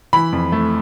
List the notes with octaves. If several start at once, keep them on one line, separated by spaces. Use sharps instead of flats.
E3 B5
F2
A3